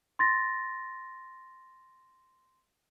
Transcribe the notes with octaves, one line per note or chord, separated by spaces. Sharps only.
C6 A6 A#6